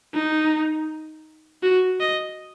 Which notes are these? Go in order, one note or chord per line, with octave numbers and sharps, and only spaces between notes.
D#4
F#4
D#5